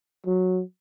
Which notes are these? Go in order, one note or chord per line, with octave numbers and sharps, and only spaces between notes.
F#3